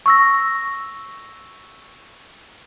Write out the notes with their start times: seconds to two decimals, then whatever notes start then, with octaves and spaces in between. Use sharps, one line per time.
0.06 C#6 E6 A#6